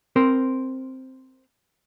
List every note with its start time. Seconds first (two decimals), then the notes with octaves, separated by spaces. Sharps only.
0.16 C4 A#4 C5